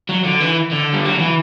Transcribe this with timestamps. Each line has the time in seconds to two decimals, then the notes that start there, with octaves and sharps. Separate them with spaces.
0.09 F#3
0.24 D3
0.41 E3
0.71 D3
0.93 G3
1.05 F#3
1.18 E3